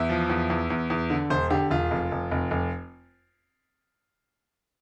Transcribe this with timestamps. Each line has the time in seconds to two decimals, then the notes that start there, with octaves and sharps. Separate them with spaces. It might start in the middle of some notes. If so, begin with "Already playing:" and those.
Already playing: E2 E5
0.10 F3
0.29 E2
0.50 E2
0.70 E2
0.90 E2
1.10 D3
1.30 E1 C5
1.50 D3 G4
1.71 E1 F4
1.91 F1
2.11 F1
2.31 F1
2.51 F1